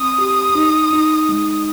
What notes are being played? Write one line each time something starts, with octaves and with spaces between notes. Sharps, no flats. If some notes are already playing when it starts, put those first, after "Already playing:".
Already playing: C4 D#6
G4
D#4
D#4
G#3